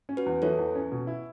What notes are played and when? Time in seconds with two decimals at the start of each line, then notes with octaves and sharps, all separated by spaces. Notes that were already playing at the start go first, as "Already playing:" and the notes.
0.09 C#4
0.17 F#4 B4
0.26 E2
0.42 E3 A4 C#5
0.58 E2
0.75 C#4
0.92 B2
1.07 E4